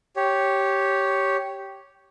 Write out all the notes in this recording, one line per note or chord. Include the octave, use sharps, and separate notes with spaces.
G4 C#5